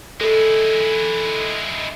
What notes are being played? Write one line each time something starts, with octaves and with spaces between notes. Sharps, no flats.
G#3 E4 A4